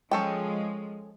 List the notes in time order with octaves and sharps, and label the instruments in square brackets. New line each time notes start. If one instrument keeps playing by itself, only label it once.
[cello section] F3 G#3 [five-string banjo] C#4 A4 G5